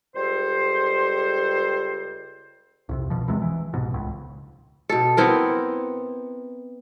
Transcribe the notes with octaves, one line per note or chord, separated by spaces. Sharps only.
C#2 G3 A4 C5
C2 F2 C3
A#1 B2 F3
A#1 E2 C3 G#3
E3
C2 G#2 B2
D1 C#2
B2 A4
B3 C4 E4 A#4